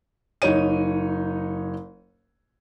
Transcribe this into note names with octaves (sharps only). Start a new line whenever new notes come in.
F#1 D#4 C#5 D#7